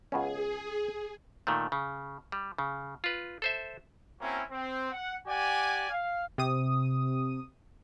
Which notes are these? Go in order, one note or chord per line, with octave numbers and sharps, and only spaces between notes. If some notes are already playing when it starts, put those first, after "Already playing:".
C#2 B3 C#4 G#4
A#2 D#3 A3
C#3
G3
C#3
F4 B4
A4 C5 E5
A#3 C4 C#4 E4 F#4
C4
F#5
G4 D5 F#5 G#5
F5
C3 D#6